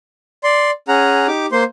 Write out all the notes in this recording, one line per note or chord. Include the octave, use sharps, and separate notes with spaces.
D5 C6
C#4 G#4 F#5 A#5
D#4 G4 D6
A#3 C5 C6